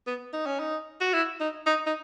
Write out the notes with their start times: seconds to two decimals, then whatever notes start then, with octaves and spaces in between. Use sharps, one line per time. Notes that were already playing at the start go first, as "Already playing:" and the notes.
0.07 B3
0.33 D#4
0.46 C#4
0.60 D#4
1.01 F#4
1.14 E4
1.40 D#4
1.67 D#4
1.87 D#4